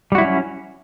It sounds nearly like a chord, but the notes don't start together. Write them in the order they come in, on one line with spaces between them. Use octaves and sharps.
G3 F#4 E4 F#3 C#4